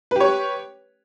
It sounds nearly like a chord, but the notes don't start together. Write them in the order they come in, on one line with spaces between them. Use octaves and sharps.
B4 G4 C#5